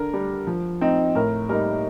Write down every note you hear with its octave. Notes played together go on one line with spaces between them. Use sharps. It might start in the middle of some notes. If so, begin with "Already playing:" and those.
Already playing: D3 A#4
G3 D4
F3
C4 D#4
A2 A#4
G3 A#3 D#4 A#4